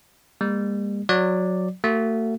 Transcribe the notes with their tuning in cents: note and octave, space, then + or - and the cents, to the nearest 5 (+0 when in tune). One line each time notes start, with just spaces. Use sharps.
G3 +45 A#3 +0
F#3 -15 D5 +0
A3 +40 F#4 +25